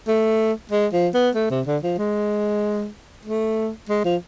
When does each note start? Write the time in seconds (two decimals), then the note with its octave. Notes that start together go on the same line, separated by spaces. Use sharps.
0.08 A3
0.71 G#3
0.93 F3
1.14 B3
1.35 A3
1.51 C3
1.67 D3
1.83 F3
1.98 G#3
3.25 A3
3.89 G#3
4.05 F3